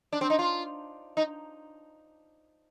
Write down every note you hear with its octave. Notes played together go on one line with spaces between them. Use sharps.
D4
C4
D#4
F4
D#4